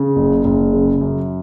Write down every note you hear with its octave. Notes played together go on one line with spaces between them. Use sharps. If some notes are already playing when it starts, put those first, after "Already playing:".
Already playing: C#3
F#1
F#1
C#3
F#2